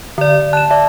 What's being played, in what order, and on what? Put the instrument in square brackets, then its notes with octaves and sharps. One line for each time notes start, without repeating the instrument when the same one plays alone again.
[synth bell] D3 D5
[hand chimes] A5 [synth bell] F#6 E7
[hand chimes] D5 E5 A5